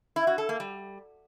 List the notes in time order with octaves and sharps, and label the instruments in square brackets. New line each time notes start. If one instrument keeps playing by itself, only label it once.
[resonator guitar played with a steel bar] E4
F#4
A4
A#3
G3